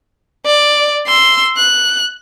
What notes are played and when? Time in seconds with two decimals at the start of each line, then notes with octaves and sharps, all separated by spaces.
0.46 D5
1.07 C6 E6
1.57 F#6